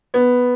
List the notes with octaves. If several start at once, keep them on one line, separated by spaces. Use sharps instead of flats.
B3